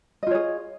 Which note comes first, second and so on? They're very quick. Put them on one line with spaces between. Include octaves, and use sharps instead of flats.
D#5 F4 C#5 G#4